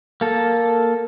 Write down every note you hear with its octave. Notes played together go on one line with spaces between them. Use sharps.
A#3 A4